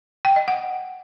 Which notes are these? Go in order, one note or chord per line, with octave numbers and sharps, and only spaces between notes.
G5
D#5
F#5